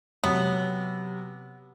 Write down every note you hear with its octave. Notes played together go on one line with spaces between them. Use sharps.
C3 F#3 B3 C#5